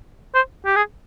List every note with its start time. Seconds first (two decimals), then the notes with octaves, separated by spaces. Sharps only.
0.35 C5
0.66 G4
0.76 G#4